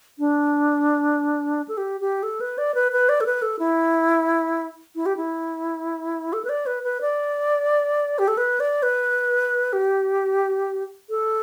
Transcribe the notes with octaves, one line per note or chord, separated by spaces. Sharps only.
D4
A4
G4
G4
A4
B4
D5
B4
B4
D5
A4
B4
A4
E4
E4
G4
E4
A4
B4
D5
B4
B4
D5
G4
A4
B4
D5
B4
G4
A4